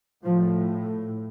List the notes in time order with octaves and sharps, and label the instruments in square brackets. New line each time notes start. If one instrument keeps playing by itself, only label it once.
[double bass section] A2 F3